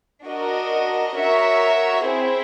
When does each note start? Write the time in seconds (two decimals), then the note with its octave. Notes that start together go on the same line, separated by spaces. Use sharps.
0.25 D4 F#4 A#4 D#5
1.16 F#4 A#4 C#5 E5
2.06 C4 E4 G#4 C5